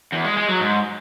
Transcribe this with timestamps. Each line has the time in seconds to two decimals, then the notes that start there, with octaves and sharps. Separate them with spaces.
0.13 E2
0.25 G#3
0.37 G#3
0.49 F#3
0.61 G#2